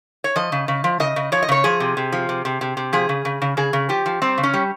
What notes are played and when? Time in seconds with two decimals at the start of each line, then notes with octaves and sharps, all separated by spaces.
0.24 C#5
0.36 F3 D#5
0.52 C#3
0.68 C#3
0.84 F3
1.00 C#3 D#5
1.16 C#3
1.32 F3 C#5
1.42 D#5
1.49 C#3 C#5
1.64 F3 G#4
1.80 C3
1.97 C3
2.12 F3
2.29 C3
2.45 C3
2.61 C3
2.77 C3
2.93 F3 G#4
3.09 C#3
3.25 C#3
3.42 C#3
3.57 C#3 G#4
3.73 C#3
3.89 F3 G4
4.06 F3
4.22 G3 C4
4.38 C#3
4.43 C#4
4.54 G3